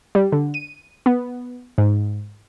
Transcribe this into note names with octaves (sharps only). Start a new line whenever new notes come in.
G3
D3
D#7
B3
G#2